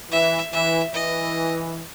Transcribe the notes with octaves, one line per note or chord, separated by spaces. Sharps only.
E3 E5
E3 E5
E3 D#5